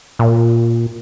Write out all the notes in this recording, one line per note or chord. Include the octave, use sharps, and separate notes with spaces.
A#2